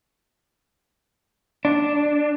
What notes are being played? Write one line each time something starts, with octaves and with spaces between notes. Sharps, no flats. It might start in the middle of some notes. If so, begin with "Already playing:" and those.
D4